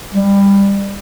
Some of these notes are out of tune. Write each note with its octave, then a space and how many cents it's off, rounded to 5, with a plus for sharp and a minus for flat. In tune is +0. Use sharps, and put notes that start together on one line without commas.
G3 +20